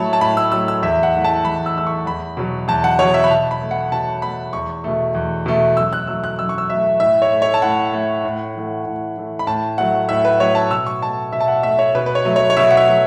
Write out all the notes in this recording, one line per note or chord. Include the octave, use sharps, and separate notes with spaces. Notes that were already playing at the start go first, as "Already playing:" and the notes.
Already playing: A2 F#3 A3 C#5 A5 B5
A5
A2 B5
E6
F#3 A3 E6
E6
E2 E5
F#5
E3 A3
A5
E2 B5
E6
E3 A3 E6
C#6
E2 B5
B2 F#3
E2 A5
F#5
B2 F#3 C#5
E5
B5
B2 A5
B5
A3
F#5
B2 A5
A3 B5
E2 C#6
B2 A3
E2
B2 A3
F#2 E6
F#6
F#3 A3 E6
F#6
F#2 E6
C#6
E6
F#3 A3 E5
A2 E5
C#5
A3
C#5
A5
A2 F#5
A3
A2
E3 A3
A2
E3 A3
B5
A2 A5
F#3 A3 F#5
A2 E5
B4
F#3 A3 C#5
A5
B2 E6
C#6
A3 A5
B2 E5
A5
F#5
A3 E5
C#5
B2 B4
B4
C#5
F#3 A3
C#5
C#5
B2 E5
F#5
E5
F#3 A3